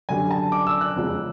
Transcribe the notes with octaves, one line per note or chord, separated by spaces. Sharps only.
F#2 D3 G3 G#5
A5
D6
E6
F#6
E2 C#3 F3 G#3